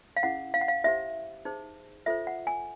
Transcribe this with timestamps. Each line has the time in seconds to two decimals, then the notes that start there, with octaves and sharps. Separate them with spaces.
0.17 F5
0.23 C#4 E4 G#4 F#5
0.54 F5
0.61 F#5
0.68 F5
0.84 E4 G4 C5 E5
1.45 D#4 G#4 C5
2.06 F4 A4 C5 E5
2.27 F#5
2.47 G#5